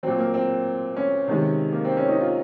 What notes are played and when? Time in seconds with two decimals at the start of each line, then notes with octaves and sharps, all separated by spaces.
0.03 A#2 F#3 C4
0.18 A#3
0.34 C4
0.96 C#4
1.28 C3 D#3 G#3
1.73 A#3
1.85 C4
1.97 C#4
2.09 D#4
2.21 F4